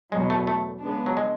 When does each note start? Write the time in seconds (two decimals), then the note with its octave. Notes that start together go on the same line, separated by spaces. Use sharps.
0.12 E2 B2 F#3 G#3
0.30 A3
0.47 A3
0.82 C#3 G#3 B3 D4
1.06 F#3
1.17 G#3